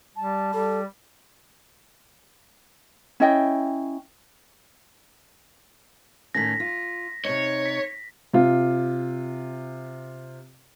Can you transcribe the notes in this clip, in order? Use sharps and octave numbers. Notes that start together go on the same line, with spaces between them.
G3 A5
G3 A4
C#4 E4 D#5 G5
A2 D#3 C#4 A#6 B6
F4
C3 D#4 C#5
B6
C3 F4